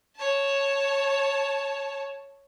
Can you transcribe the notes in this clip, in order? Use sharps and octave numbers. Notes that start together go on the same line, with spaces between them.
C#5 A5